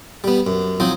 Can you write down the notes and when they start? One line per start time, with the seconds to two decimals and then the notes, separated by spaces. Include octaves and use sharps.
0.24 G3 B3
0.47 F#2
0.80 F3 F#3 C4 D#4